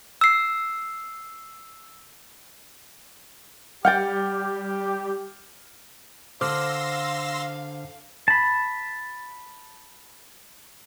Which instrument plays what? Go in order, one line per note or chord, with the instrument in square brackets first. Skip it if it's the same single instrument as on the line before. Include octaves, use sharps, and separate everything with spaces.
[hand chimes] E6 C7
[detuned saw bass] G3 [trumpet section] G4 [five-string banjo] F#5 G5 [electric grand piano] F6 G6 A6
[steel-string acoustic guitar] D3 [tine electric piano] C5 D6 F6 [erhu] F5 [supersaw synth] C6 E6 A#6
[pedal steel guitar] A5 B5